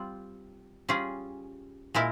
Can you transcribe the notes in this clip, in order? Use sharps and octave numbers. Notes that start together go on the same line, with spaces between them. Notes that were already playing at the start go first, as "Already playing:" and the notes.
Already playing: G3 C4 F4
G3 C#4 F4 G#4
A#2 G#3 E4 A#4